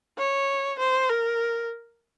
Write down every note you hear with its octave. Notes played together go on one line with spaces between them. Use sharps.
C#5
C5
A#4